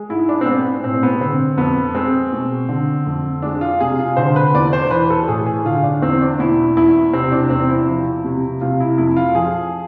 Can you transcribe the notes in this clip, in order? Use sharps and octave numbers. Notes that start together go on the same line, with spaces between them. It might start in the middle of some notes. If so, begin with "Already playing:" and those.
Already playing: G#3
G#2 E4
D4
C4
G#3 B3
A2 C4
B3
D3 C4
F2 B3
G#3 C4
B2
D3
F2
G#3 D4
F4
C3 G#4
F4
D3 C5
B4
E2 D5
C5
E3 B4
A4
A2 G#4
G#4
D3 F4
D4
E2 C4
D4
B2 E4
E2 E4
C3 C4
D4
E2 C4
E4
F3
C3
C3 F4
E4
F2 E4
F4
F3 G#4